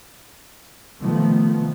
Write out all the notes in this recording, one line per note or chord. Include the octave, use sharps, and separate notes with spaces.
C3 D#3 F3 A3 B3